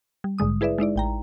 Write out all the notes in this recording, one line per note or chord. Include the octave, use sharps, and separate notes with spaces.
G3
A#1 G#2 D3 G#3 D#6
E4 G#4 B4 D5 E5
G#3 D#4 E4 D5
A1 G5 A#5